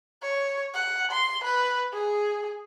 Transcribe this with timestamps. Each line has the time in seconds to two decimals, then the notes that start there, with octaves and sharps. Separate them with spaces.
0.22 C#5
0.74 F#5
1.12 C6
1.44 B4
1.93 G#4